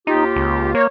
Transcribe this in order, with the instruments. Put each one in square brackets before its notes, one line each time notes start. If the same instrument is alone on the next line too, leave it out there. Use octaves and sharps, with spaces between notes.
[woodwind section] D#2 F4 G4 [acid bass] D#4
[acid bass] C#2
[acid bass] A#3 [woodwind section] C#5